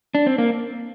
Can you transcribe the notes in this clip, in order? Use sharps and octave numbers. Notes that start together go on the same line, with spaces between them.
D4
C4
A#3